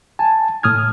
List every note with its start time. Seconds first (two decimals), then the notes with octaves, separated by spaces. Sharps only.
0.19 G#5 A5
0.63 A2 D#6 F6 G#6